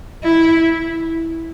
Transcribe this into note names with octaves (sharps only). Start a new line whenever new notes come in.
E4